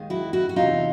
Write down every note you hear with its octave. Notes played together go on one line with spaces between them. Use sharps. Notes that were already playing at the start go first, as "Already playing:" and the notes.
Already playing: D#2 D#3 G#3
E4 F#4
E4 F#4
F#4
E2 C3 E3 D#4 F4